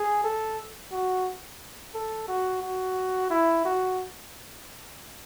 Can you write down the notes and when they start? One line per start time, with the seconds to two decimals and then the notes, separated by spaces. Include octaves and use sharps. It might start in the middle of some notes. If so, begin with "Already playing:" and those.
Already playing: G#4
0.24 A4
0.92 F#4
1.94 A4
2.28 F#4
2.62 F#4
3.30 E4
3.65 F#4